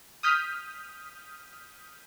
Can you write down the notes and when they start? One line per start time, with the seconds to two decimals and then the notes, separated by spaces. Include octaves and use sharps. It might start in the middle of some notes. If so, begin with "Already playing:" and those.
0.23 D#6 F6 G6 B6